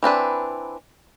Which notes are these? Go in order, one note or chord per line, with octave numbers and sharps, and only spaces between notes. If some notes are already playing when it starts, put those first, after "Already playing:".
E3 C4 D4 B4